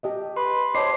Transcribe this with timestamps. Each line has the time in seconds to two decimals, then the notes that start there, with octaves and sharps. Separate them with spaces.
0.03 G4 D#5 E5
0.37 B4 C6
0.75 G4 C5 C#5 D#5 A5 C6 D6 C7